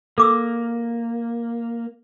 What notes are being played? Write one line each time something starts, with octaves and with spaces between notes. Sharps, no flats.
A#3 A4 D6 E6